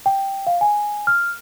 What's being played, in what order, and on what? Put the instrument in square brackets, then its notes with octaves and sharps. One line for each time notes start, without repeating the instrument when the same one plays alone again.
[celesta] G5
F5
G#5
F6